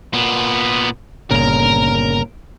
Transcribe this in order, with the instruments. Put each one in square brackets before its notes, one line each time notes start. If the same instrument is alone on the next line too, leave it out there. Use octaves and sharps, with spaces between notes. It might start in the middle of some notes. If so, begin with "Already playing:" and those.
[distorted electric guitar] A#2 B3
[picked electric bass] G1 A#2 C#3 [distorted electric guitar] A#4 A#5